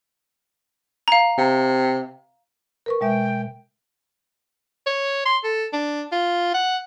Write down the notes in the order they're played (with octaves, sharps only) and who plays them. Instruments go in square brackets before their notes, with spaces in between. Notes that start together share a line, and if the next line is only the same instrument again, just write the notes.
[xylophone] F5 A#5
[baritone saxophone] C3
[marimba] A#4 B4 C#6
[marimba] B2 G#3 E5 [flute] G5
[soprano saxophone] C#5
C6
A4
D4
F4
F#5